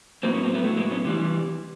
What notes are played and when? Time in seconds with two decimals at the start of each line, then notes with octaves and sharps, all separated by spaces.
0.23 A2 F#3 A#3 C4
0.33 B3 C#4
0.43 A#3 C4
0.54 A3 B3
0.64 A2 F#3 A3
0.77 G#3 A#3
0.91 B3 C#4
1.05 C3 E3 G3